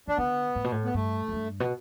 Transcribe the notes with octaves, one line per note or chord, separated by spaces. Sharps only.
E3 D4
D3 B3
A2
B2
A2
B3
G2 A3
E2
G2
B2